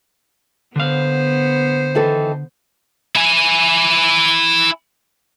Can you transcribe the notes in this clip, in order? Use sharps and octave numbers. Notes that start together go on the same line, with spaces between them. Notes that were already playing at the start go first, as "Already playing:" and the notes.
D3 B3 C5 F5
D#3 E3 A4
E4 G#5